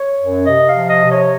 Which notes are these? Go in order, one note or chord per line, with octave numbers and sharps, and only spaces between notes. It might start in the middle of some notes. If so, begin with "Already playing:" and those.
Already playing: C#5
F#2
C3 D#5
F5
F3
D#5
C3
C#5